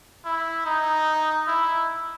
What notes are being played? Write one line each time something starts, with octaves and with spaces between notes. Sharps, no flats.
E4
D#4
E4